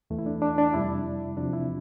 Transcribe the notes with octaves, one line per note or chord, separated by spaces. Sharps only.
E2 E3 A3
E4
D4
D4
D4
F2 C3 G3 E4
E2 C3 F3 D4
E4